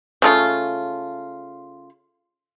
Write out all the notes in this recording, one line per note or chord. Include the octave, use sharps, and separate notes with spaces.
C#3 A3 F4